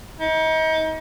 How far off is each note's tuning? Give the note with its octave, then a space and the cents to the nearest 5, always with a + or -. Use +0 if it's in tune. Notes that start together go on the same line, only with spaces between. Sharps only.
D#4 +35